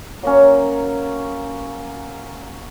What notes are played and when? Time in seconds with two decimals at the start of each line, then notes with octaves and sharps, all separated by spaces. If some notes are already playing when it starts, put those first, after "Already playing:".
0.23 F#3 A#3 C#4